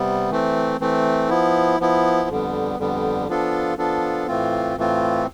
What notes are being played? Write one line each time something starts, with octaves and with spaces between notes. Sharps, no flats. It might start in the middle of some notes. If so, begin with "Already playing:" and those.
Already playing: C3 G3 B3
E3 A3 C4
E3 A3 C4
F3 B3 E4
F3 B3 E4
F2 D3 G3 B3
F2 D3 G3 B3
F3 B3 D4 F4 A4
F3 B3 D4 F4 A4
A2 E3 A3 C4 F4
A2 E3 A3 C4 F4